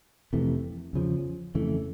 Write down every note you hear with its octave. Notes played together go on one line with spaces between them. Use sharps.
F2 C3 E3 A3
E2 C#3 F3
F2 C#3 E3 A3